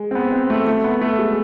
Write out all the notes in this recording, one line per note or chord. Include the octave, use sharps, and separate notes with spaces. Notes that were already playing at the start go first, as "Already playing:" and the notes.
Already playing: G#3
C4
B3
C4
A3
A3
B3
A3
G#3